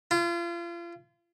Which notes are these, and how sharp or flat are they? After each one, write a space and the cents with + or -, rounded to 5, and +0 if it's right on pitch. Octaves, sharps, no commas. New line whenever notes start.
F4 -35